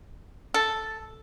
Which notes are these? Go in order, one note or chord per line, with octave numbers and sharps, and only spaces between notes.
A4